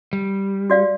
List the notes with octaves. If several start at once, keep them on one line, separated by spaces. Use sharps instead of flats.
G3
F#4 D5 F5